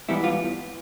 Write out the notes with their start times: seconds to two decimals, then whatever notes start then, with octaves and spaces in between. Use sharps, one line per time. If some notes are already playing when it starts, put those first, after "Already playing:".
0.08 G#2 E3 G3 B3 E4
0.24 F4